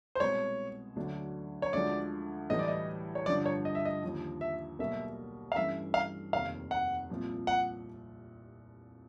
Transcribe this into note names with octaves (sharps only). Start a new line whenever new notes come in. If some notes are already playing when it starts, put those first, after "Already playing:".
C5
C2 B2 G#3 B3 C#5
D2 D3 F#3 A3 D4
C#5
D2 D3 F3 G#3 D5
A2 E3 G3 D#5
D5
D#5
C#5
G2 D3 F3 D5
C#5
D#5
E5
D#5
D#2 D3 F3
E5
B1 B2 G3 A#3 E5
F5
G2 E3 A3 C#4 E5
F5
F1 D#2 D#3 F5
F#5
C2 A#2 F3
F#5